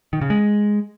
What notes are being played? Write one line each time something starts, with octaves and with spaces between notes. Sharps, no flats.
D#3
C#3
G#3